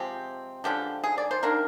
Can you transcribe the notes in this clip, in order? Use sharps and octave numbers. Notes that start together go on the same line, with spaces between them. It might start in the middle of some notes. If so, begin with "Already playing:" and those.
Already playing: C3 F3 G#3 C4 G4
D3 F3 G#3 D4 G4
G#4
D5
C5
D#3 A#3 D4 A#4